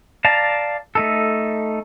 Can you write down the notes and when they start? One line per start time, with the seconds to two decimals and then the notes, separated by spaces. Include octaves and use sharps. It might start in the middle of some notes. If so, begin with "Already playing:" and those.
0.25 D5 F5 A5 A#5
0.95 A3 D#4 A4